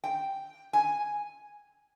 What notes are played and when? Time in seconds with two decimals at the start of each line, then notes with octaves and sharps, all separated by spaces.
0.04 G5
0.73 G#5